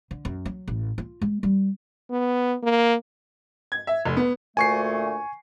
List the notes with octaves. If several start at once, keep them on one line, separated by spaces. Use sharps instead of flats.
D3
F#2
F#3
A1
F4
G#3
G3
B3
A#3
G#6
E5
F1
B3
D2 A#2 A3 G#5 C#6 C7